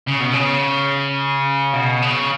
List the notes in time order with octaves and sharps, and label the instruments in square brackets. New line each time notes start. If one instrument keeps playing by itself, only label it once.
[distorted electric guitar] C#3
B2
C#3
B2
C#3